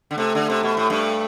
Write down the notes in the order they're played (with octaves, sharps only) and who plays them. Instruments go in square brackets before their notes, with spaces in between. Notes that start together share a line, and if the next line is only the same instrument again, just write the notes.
[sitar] D3
[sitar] C3 [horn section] A3
[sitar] D3
C3
B2
A2
G2